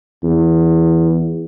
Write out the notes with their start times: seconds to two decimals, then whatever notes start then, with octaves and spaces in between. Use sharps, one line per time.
0.24 E2